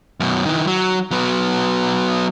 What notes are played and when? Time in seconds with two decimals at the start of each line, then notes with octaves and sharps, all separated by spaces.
0.20 F#2 B2
0.45 D#3 E3
0.67 F#3
1.11 F#3 B3